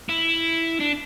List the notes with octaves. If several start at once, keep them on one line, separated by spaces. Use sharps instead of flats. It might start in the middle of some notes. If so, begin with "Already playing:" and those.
E4
D4